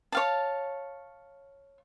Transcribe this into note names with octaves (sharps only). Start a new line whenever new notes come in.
C#5 F5 A5